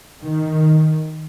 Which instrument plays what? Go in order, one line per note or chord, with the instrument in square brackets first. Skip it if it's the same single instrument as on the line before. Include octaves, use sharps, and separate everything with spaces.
[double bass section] D#3